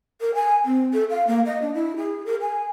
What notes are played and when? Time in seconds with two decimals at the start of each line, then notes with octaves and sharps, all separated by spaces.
0.21 A#4
0.35 G#5
0.65 C4
0.93 A4
1.10 F5
1.27 A#3
1.46 D#5
1.62 D4
1.75 E4
1.97 G#4
2.26 A#4
2.41 G#5